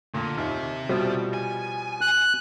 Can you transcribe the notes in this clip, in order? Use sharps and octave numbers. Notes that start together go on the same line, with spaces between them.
A#2 D3
D#2 C3 E5
B2 F3 G3
G#5
F#6